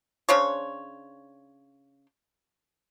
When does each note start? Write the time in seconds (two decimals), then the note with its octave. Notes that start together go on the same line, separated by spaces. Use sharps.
0.29 C#3 D4 C5 C#5